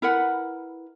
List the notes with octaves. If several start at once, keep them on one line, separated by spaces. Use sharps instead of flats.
E4 A#4 B4 F#5